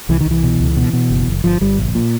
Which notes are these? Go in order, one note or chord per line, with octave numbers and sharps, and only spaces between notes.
C2 E3
D#3
C2
E3
B2
C#2
B2
B2
F#1
F#1
G1 F3
G1 G3
A#1
A#2